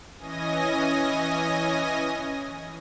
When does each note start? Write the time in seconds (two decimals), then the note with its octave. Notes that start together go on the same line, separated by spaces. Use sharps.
0.18 E3 C#4 D#5 G#5 D#6 A#6